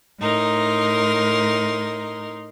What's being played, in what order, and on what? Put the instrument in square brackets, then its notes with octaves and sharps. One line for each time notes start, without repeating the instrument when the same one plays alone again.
[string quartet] A2 D#4 A#4 C6